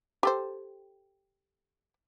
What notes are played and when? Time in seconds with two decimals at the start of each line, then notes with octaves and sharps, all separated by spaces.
0.23 G4 A4 C5